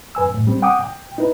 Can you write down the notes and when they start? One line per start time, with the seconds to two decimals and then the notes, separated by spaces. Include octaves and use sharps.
0.15 F#2 B4 G#5 E6
0.31 F#2 A2
0.47 G3 C4
0.62 F#5 G5 D6 D#6
0.81 G5
1.18 D#4 E4 B4